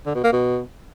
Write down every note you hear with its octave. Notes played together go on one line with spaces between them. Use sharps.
D3
B2
A#3
B2